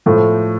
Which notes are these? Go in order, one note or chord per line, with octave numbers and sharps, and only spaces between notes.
A2 F3 A3